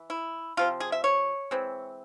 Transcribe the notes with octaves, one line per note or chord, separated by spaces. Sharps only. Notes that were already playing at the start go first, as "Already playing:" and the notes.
Already playing: E3
E4
C3 F3 C4 F4
G#4
E5
C#5
E3 G#3 C4